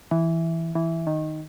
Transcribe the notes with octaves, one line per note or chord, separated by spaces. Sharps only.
E3
E3
D#3